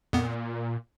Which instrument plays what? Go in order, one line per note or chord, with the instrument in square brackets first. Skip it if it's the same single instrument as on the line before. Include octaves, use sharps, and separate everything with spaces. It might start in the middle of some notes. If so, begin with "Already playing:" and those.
[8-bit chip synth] F2 B3 [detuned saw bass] A#2